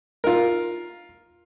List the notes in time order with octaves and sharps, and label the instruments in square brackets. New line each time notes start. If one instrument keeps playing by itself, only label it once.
[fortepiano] F4 A#4